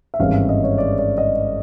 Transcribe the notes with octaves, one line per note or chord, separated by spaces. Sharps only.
E5
G#1 G2 E3 G#3 C#4 F5
E5
D#5
C#5
D5
D5
D#5